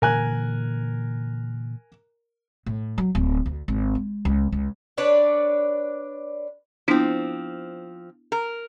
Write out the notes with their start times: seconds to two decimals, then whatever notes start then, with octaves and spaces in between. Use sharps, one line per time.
0.02 A#2 D3 E3 A#4 G#5 F#6
2.66 A2
2.98 F#3
3.15 D1
3.46 D2
3.68 G#1
3.95 G#3
4.25 C#2
4.52 C#2
4.98 D4 B4 C#5 D5
6.88 F3 B3 C4 D4 E4
8.32 A#4